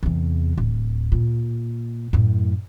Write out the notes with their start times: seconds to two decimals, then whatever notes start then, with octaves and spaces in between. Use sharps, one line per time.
0.03 E2 C3
0.58 D1
1.12 A#2
2.13 F#2 A2